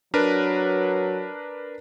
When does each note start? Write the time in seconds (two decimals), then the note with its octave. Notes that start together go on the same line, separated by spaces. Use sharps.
0.14 F#3 D4 A#4 B4